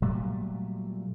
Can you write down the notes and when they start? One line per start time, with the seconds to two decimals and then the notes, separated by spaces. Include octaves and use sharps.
0.02 A#2 F#3 G3 A3